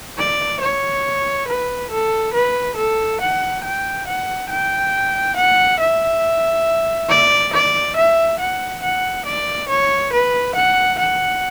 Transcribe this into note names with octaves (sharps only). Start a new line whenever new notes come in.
D5
C#5
B4
A4
B4
A4
F#5
G5
F#5
G5
F#5
E5
D5
D5
E5
F#5
F#5
D5
C#5
B4
F#5
F#5